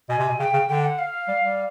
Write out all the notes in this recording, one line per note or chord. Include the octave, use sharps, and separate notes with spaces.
B2 G#5
C3
B2
C#3 G5
C#3
D3 G5
F#5
F5
G3
G3